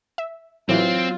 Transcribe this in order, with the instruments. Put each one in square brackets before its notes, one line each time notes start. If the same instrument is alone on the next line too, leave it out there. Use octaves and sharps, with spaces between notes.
[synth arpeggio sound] E5
[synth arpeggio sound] A2 E3 [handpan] F#3 [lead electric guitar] C4 [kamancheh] F4